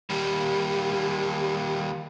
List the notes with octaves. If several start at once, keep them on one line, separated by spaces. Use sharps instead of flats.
D#2 G3